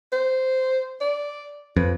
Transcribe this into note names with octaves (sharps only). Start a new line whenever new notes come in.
C5
D5
F2 B4